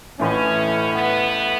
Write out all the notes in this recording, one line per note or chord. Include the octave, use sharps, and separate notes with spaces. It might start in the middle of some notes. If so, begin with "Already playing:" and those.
A1 A2 E3 A3 C#4
B3